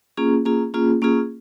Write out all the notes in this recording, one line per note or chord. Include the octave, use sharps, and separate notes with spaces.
A#3 C#4 F4 G#4
A#3 C#4 F4 G#4
A#3 C#4 F4 G#4
A#3 C#4 F4 G#4